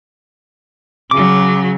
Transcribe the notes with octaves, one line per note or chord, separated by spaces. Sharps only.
C#3 F#3 D6